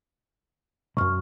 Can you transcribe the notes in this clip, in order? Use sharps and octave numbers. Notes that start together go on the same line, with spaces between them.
B1 F#2 C#6 F6